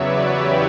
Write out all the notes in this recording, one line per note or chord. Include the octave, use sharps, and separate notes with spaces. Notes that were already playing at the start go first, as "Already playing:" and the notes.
Already playing: E2 C#3 F#3 B4 C#5 D5 E5
E4 G4